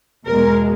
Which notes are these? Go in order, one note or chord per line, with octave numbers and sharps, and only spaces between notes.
E2 B2 G#3 A#4